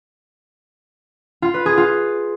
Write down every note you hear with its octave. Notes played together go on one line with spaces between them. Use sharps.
F4
B4
G#4
F4